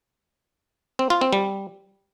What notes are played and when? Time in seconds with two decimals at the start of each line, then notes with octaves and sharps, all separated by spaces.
0.99 C4
1.10 F4
1.21 C4
1.33 G3